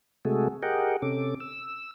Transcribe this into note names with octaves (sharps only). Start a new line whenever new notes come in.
C3 G#3 A3 F#4 G#4 A4
G4 G#4 A#4 D#5 F#5 G5
C3 C#4 A4 D6
E6